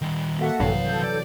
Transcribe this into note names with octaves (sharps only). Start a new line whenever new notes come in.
D#3 G3
A#3 F#4 A4 E5 F#5
A#1 G2 C3 D#3 E3 F#3 F5
A4 G6
D5